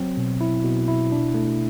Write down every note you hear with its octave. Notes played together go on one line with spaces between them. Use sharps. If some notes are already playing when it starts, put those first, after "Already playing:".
Already playing: F#3 C4
B2
E4
B2
E4
D4
A3